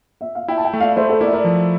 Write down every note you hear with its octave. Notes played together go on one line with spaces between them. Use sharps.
E5
F5
E4 E5 G5
A5
E5 G5
A3
D5 F5
A3 C5 E5
A4 C5
E4 A#4 D5
E5
A#4 D5
F3